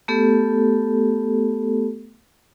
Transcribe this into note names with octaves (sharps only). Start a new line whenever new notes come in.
A3 B3 G4 A4